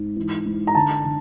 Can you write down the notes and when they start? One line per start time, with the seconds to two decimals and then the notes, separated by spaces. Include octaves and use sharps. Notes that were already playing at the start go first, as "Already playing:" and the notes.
Already playing: G#2
0.16 E3
0.46 G#2
0.67 A#5
0.75 D3 A5
1.05 D3